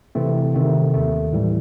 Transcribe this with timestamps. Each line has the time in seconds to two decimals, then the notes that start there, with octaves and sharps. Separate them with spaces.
0.15 C3 E3 A3 C4
0.54 C3 D#3 A3 C4
0.94 D#2 D#3 A3
1.33 A2 E3 G3